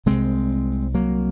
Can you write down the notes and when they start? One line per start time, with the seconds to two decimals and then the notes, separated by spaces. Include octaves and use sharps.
0.06 C2 C3 G#3 C4
0.95 F#3 A#3